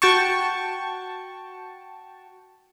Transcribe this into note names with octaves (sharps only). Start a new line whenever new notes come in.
F#4 G5 A5 C#6